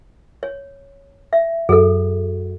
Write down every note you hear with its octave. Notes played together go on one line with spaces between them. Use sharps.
C#5
E5
F#2 G#4 A4